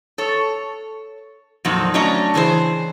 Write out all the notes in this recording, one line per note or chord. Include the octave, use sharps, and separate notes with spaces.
A4 C#5
F2 A#2 F#3 C4 D#4
F#3 A3 C#4 D4 D#5 A#5
C#3 E3 G#4 C5